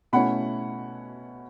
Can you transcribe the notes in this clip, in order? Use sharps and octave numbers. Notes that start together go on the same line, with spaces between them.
B2 A3 C#4 E4 F#5 B5